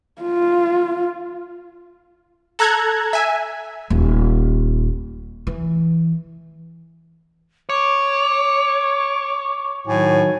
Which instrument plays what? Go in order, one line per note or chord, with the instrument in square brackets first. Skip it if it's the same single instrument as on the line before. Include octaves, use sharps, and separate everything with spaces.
[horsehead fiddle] F4
[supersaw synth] A4 A#5 F#6 G#6
E5 G#5
[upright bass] D#1
E3
[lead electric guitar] C#5 [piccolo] D6
[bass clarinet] A2 [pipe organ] D#3 F#3 [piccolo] G#5